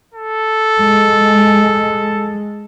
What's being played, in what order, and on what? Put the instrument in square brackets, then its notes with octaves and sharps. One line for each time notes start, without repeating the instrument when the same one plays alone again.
[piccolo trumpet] A4
[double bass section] G#3